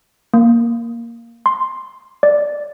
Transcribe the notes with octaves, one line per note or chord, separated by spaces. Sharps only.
A#3
C6
D5